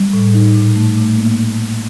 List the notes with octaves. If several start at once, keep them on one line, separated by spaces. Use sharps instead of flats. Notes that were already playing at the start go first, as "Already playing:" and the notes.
Already playing: G3
A2
D#4
A#2
A3
A#2
A#3